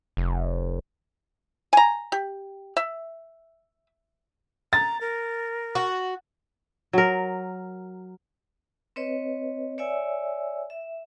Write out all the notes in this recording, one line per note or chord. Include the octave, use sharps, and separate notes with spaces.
F1
G#5 A#5
G4
E5
A#5 A6
A#4
F#4
F#3 A#4
C4 B4 C#5 D#5
C#5 D5 E5 G#5 E6
E5